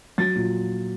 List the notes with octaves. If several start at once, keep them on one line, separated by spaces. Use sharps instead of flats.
F#3 A6
A#2